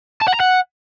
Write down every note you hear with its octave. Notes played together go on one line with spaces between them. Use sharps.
A5
F#5
A#5
F#5